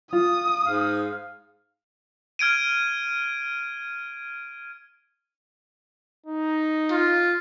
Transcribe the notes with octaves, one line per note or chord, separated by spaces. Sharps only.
F4 D#6
G#2 F5
F6 G#6 D7 D#7
D#4
F4